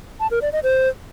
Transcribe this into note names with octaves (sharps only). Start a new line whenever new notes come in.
A5
A#4
D5
D#5
C5